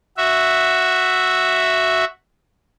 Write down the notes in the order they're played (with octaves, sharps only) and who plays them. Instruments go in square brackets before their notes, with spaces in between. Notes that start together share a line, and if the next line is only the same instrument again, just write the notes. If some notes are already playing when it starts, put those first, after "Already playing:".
[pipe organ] F#4 E5